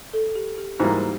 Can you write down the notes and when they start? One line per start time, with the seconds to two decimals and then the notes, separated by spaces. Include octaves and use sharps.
0.13 A4
0.36 G4
0.58 G4
0.79 G#2 E3 G3 A#3 F#4